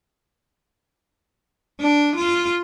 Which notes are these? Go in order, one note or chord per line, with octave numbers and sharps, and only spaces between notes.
D4
F4